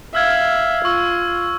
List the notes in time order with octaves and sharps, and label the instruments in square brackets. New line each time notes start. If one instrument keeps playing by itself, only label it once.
[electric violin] E5 F5 [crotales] E6 F6 G#6
[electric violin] F4 [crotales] C#6 E6